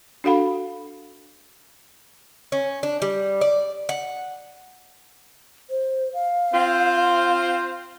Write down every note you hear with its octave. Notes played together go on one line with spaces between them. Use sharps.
D4 F#4 A4 F5 F#5 B5
C#4
D4
G3
D5
F#5
C5
F5
C4 F4 C5